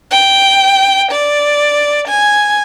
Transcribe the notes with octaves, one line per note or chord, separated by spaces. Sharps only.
G5
D5
G#5